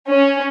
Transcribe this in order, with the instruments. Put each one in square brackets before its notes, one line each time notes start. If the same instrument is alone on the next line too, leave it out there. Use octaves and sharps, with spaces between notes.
[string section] C#4